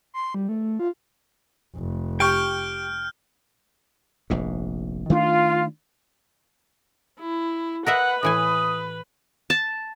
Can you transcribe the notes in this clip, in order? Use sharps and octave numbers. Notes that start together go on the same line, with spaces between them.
C6
G3
A3
F4
F1
G4 G5 C#6 F6 G6
F1 A#1 G#2
D#3 A3 D4 F4
E4
A#4 B4 D#5 E5 F#5
A2 E3 G#5 D#6
A5